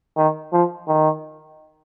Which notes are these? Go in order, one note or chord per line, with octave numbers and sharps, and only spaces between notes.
D#3
F3
D#3